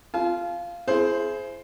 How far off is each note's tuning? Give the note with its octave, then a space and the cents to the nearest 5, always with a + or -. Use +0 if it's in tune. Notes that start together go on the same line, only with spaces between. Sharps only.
F4 -10 A5 -45
E4 +30 G#4 +30 C5 +0